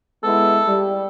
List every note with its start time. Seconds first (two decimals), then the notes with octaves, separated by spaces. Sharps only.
0.24 G#3 B3 E4 A4
0.66 G3